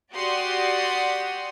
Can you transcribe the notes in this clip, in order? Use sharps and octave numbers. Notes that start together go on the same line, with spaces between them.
F#4 G4 D5 F#5 C6 D#6